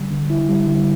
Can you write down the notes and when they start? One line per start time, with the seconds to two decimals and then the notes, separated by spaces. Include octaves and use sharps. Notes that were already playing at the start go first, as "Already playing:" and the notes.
Already playing: D3 G3
0.11 D3
0.30 E4
0.49 G3
0.67 D3